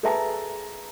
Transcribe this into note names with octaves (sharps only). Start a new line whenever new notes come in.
G#4 A4 B4 E5 A5 A#5